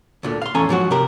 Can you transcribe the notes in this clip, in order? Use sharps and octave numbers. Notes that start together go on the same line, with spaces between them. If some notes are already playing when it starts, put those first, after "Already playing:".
D2 A#2 D3
F5 C6
E2 A2 C#4 A4 G#5 A#5
G#2 F3 F#3 F#4
C3 G4 A#4